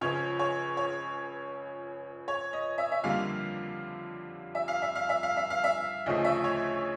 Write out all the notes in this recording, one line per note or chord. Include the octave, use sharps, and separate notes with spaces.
C#2 C#3 F3 C#5
C#5
C#5
C#5
D#5
E5
E5
F2 D3 G3 A#3 F5
E5
F5
E5
F5
E5
F5
E5
F5
E5
D2 C#3 F3 A3 D#5
E5
C#5